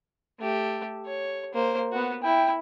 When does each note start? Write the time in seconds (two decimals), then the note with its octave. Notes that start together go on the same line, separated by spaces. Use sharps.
0.40 A3 G4
1.06 C#5
1.53 A#3 C5
1.92 B3 F#4
2.23 E4 G5